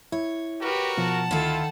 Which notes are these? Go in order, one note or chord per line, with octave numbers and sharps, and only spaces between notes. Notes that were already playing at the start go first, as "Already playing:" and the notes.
E4 C#5
F#4 G4 A#4 B4
B2 F3 F#5 A5
D2 D#3 E4 F4 A4